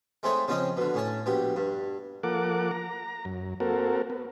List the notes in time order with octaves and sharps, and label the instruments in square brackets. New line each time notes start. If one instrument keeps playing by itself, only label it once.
[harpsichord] G#3 A3 C4 D#4 C#5 E5
C#3 F3 C4 C#4 D#5
B2 D3
A2 C#4 A5
A#1 B2 G4
G2
[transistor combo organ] F3 A#3 A4 A#4 F#5 D6
A#5
F#2
A#3 C4 F#4 A4 A#4
B3